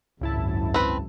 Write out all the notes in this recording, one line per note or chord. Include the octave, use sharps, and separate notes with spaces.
G#1 C#2 F#2 E4 A5
C4 B4